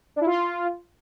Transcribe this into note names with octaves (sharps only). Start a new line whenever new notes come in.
D4
E4
F4